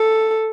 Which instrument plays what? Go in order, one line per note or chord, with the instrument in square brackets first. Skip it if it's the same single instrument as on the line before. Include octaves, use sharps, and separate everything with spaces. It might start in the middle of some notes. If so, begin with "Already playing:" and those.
Already playing: [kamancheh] A4